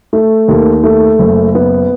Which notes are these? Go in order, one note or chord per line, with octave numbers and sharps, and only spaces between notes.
A3
D#2
A3
F#1
B3